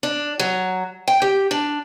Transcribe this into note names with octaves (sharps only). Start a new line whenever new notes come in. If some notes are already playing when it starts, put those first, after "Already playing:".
D4
F#3
G5
G4
D4